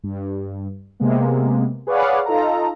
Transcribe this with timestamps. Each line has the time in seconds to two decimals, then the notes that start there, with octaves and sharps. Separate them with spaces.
0.04 G2
1.00 C3 G#3 A#3 B3
1.87 G#4 B4 C#5 D5 F5 F#5
2.26 D#4 F4 A4 A#5